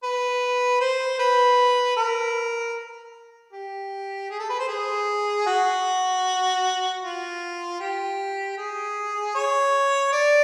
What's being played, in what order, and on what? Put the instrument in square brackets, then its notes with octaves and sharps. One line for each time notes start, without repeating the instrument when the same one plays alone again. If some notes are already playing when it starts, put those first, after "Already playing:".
[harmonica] B4
C5
B4
A#4
G4
G#4
A4
B4
C5
G#4
F#4
F4
G4
G#4
C#5
D5